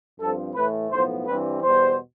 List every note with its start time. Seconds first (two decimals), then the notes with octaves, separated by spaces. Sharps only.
0.20 G2 F3 C4 A4
0.56 A2 E3 A3 B4
0.91 B1 A2 F3 B3 C5
1.27 G2 E3 G3 C4 B4
1.63 E2 B2 G3 C5